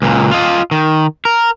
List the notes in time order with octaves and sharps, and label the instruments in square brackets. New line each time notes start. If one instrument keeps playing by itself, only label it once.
[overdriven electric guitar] C#2 A#2
F4 D#5
D#3
A#4